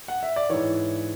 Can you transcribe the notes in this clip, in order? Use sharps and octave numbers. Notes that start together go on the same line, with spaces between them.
F#5
E5
D5
G#2 E3 C#5